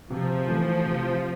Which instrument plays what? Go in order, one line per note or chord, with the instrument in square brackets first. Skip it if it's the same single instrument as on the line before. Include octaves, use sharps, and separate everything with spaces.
[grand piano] C3 [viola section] F3
[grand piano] E3 A3
C3